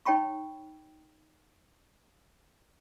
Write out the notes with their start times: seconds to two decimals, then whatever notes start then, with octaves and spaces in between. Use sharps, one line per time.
0.05 D#4 C#5 G5 B5 C#6